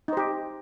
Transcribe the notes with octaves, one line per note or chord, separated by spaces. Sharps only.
D#4 G4 C5